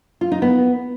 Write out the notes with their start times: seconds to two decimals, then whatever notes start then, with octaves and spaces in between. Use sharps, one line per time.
0.21 F4
0.32 D#4
0.42 B3